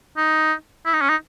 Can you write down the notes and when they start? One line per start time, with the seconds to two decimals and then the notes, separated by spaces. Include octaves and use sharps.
0.17 D#4
0.86 E4
0.94 D#4
1.01 C#4
1.09 D#4